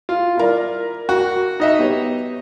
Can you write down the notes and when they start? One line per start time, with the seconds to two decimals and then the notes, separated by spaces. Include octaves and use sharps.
0.09 F4
0.37 E4 A#4 D5
1.09 F#4
1.60 D#4 D#5 E5
1.79 B3 G4 C#5